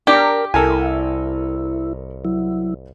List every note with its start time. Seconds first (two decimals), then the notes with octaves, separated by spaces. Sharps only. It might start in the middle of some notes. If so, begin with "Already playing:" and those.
0.07 D4 G4 A#4
0.54 C2 E4 A4 A#4 G#5
2.25 F#3 E4